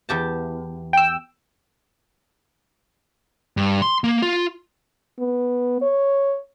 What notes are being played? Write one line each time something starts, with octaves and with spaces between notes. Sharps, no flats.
E2 G4 A5
G5 E6
G2
C6
A#3
F4
B3
C#5